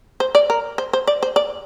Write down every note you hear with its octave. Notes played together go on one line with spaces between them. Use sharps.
C5
D5
A#4
C5
C5
D5
C5
D5